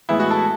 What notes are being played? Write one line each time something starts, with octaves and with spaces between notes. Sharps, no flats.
A2 E3 G#3 B3 E4
F#4
A4